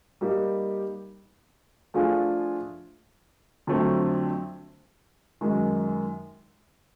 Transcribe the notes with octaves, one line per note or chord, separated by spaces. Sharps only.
G3 A#3 D#4 G4
F3 A3 D4 F4 G#4
F2 D3 F#3 A3 C4
F#2 D#3 G#3